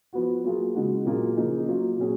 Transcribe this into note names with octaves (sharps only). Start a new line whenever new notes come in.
F3 B3 F#4
F#3 A#3 F4 G#4
C#3 G#3 D#4 F#4
A#2 F#3 A#3 F4 G#4
C#3 F3 A#3 D#4 G#4
F#3 A#3 F4
A#2 F#3 C#4 G#4